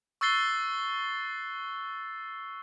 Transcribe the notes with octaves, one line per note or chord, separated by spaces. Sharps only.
C#6 E6 F#6 A6 C7 G7